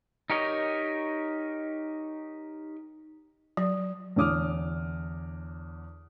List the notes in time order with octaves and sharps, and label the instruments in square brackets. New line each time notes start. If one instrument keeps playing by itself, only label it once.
[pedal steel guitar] D#4 G4 A#4 C#5 D#5
[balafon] F#3
[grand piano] E2 D3 C#5 D6 D#6 F6